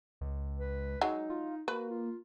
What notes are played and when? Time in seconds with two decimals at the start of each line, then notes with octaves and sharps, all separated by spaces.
0.21 C#2
0.59 B4
1.01 F#3 G#3 D#4
1.30 F4
1.68 A#3 F#4 B4
1.90 F4